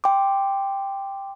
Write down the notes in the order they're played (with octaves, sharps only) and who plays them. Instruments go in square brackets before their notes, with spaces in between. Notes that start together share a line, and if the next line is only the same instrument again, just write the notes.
[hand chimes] G5 C6 D6